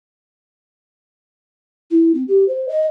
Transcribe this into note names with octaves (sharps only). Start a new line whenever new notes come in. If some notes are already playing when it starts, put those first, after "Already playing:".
E4
C4
G4
C5
D#5